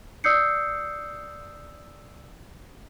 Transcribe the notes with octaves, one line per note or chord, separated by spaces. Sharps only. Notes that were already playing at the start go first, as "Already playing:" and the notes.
D5 D#6 E6 G6 C7 C#7